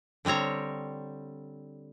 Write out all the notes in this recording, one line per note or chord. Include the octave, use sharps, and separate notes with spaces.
D3 G3 C4 C#5 A#5